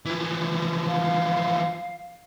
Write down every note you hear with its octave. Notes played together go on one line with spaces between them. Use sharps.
E3 F3
F5